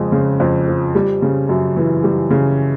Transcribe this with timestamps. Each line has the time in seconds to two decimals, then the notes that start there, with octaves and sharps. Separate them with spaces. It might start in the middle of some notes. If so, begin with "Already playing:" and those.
Already playing: F2 C#3 F3 G#3
0.12 C#3
0.40 F2
0.68 F3
0.95 G3
1.22 C#3
1.49 F#2
1.76 E3
2.04 G3
2.30 C#3